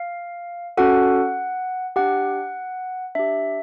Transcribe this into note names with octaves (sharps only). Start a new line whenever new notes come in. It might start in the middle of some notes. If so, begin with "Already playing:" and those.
Already playing: F5
C#4 F#4 A4 F#5
D4 G4 F#5
D4 G4 E5